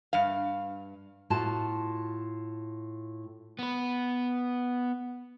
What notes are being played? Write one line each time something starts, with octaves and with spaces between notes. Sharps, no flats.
G2 F5
A2 F4 F#4 A5
B3 B4